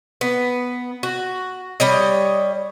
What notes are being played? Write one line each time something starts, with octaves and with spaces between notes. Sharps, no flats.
B3
F#4
G3 C#5 D#5